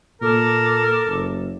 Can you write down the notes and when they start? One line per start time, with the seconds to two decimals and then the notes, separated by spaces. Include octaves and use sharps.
0.22 A#2 A4 A#4 D6
1.07 F#1